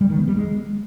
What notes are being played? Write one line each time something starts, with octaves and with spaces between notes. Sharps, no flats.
G3
D#3
B3
G3
G#3